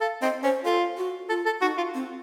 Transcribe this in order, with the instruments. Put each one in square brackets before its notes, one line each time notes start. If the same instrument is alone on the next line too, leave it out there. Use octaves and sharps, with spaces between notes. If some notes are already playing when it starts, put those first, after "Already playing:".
[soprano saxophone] A4 [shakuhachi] F5
[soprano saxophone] C4 [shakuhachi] D#5
[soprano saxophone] C#4 [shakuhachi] C5
[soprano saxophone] F4 [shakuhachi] A4
[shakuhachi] F#4
[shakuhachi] F4 [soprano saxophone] A4
[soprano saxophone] A4
[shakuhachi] D#4 [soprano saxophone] F#4
[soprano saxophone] F4
[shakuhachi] C4